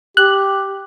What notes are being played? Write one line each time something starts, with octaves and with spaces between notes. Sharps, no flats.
G4 F#6